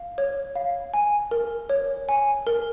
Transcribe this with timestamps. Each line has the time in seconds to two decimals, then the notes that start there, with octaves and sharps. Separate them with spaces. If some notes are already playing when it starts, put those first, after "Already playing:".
Already playing: F5
0.18 C#5
0.55 F5
0.94 G#5
1.31 A#4
1.70 C#5
2.09 G#5
2.47 A#4